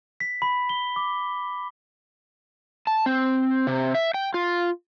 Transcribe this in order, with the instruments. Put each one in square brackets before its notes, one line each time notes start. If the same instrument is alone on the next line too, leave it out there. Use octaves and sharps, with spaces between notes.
[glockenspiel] B6
B5
G7
D6
[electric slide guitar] A5
C4
C3
E5
G5
F4